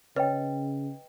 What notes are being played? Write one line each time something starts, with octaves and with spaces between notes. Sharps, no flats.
C#3 B4 C#5 D#5 G5